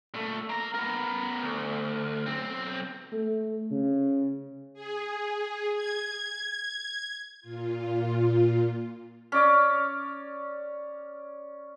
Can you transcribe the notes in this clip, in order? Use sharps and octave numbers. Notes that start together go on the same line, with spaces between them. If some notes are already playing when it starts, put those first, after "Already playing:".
A#2 A3
A#3 A#5
B3 A#4
D2
B1 C4
A3
C#3
G#4
G#6
A#2 F4
C#4 D5 D6